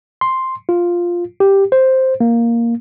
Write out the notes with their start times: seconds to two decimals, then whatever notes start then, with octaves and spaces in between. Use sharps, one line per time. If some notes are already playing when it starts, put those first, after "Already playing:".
0.21 C6
0.69 F4
1.40 G4
1.72 C5
2.21 A#3